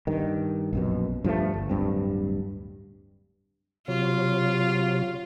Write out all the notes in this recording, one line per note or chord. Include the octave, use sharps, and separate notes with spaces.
G2 D#3
A#1 F#2 B2
G2 F3 F#3 A3
G1
D1 G2 C4
C3 F#3 F4